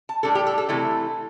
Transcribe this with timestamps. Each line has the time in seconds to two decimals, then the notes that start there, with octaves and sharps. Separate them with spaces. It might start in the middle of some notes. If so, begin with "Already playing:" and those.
0.09 A5
0.23 A2 G3 D4 A4
0.35 G4
0.47 A4
0.58 A4
0.69 C3 E3 A3 E4 A4